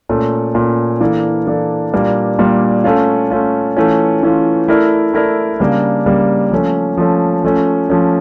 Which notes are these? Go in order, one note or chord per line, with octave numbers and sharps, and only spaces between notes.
A#2 A3 C#4
A#2 A3 C#4
E3 A#3 D4 A4
E3 A#3 D4 A4
A#2 G3 A#3 D4
A#2 G3 A#3 D4
A3 C#4 F4
A3 C#4 F4
E3 A3 C#4 F4
E3 A3 C#4 F4
A3 E4 A#4 D5
A3 E4 A#4 D5
C#3 G3 A#3 D4
C#3 G3 A#3 D4
F3 A3 C#4
F3 A3 C#4
F3 A3 C#4
F3 A3 C#4